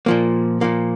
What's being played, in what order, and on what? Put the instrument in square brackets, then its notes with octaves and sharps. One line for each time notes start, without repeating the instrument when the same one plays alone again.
[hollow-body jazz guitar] A#2 F3 A#3
A#2 F3 A#3